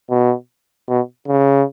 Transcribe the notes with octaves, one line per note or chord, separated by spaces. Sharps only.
B2
B2
C#3